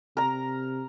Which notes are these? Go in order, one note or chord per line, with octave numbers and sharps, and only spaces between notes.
C3 A#4 A#5